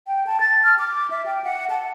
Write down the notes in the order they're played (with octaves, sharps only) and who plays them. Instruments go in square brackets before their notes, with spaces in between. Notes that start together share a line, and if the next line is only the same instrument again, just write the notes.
[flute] G5
A5
A6
F6
D6
E5
G5
F#5
A5